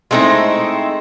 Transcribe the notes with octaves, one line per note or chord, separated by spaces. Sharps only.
G#3 A3 C4 D#4 E4